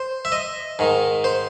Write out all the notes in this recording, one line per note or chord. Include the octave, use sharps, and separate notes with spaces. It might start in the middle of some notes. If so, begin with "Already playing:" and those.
Already playing: C5
E5
D#5
G#2 D#3
C5